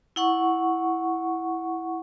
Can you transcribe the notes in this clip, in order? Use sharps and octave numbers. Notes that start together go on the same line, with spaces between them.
E4 F#5 C#6